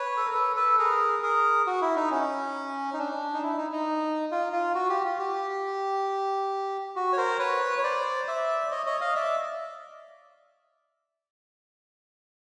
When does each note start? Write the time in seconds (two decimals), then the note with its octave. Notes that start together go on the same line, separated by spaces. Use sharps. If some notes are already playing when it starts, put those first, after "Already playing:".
Already playing: B4 C#5
0.17 A4
0.26 A#4
0.34 A4 B4
0.56 A4 B4
0.79 G#4 A#4
1.23 G#4 A#4
1.67 F#4
1.82 E4
1.96 D#4
2.11 C#4
2.94 D#4
2.99 D4
3.34 D#4
3.43 E4
3.57 D#4
3.73 D#4
4.31 F4
4.53 F4
4.75 F#4
4.90 G4
5.05 F4
5.19 G4
6.96 F#4
7.13 C#5
7.17 A#4 C5
7.39 B4 C#5
7.79 C#5
7.83 C5 D5
8.28 D5 E5
8.67 D5
8.71 C#5 D#5
8.86 C#5 D#5
9.01 D#5 F5
9.15 D5 E5